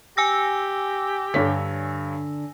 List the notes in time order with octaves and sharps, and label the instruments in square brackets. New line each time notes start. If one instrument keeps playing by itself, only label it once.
[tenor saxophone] G4 [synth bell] G#5 E6 A#6
[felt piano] G2 C#5 B6 [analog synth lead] D3